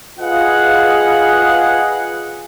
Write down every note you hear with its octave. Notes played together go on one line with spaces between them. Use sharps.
F4 G#4 B4 D#5 F5 F#5